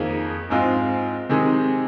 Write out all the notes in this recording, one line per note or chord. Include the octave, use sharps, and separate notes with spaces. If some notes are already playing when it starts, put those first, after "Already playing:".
Already playing: F2 D#3 A#3 G#4
G#2 G#3 C4 F4
C3 D#3 G#3 C4 G#4